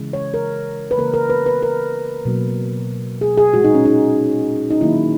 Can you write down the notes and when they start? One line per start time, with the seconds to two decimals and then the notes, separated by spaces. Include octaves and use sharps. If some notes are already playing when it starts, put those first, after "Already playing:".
Already playing: C#3 E3 G#3
0.13 C#5
0.34 A#4
0.91 B4
0.98 C#3 E3 A#3 A#4
1.14 A#4
1.30 B4
1.46 B4
1.62 A#4
2.25 B2 F#3 A#3
3.21 G#4
3.38 G#4
3.54 A#2 G#3 F#4
3.64 D#4
3.74 C#4
3.85 D#4
4.70 D#4
4.81 D#3 F#3 A#3 E4